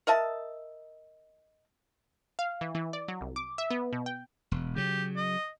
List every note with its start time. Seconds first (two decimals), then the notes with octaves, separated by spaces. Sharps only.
0.07 A#4 D#5 E5 A5
2.39 F5
2.61 E3
2.75 E3
2.93 D5
3.08 F#3
3.21 C2
3.36 D6
3.58 E5
3.70 B3
3.93 B2
4.06 G5
4.51 E1
4.76 C#3 F#3 G4
5.16 D#5